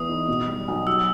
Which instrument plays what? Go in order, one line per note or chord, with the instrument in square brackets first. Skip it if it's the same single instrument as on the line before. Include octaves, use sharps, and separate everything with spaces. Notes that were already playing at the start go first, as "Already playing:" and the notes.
Already playing: [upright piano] E2 E3 B3 [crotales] D#6
[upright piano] D#4
B2
G3
B1
[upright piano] F#3 [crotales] E6